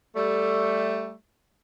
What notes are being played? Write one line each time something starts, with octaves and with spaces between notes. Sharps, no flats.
G3 A3